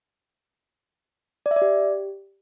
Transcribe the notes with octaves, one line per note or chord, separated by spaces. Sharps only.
D5
E5
D5
G4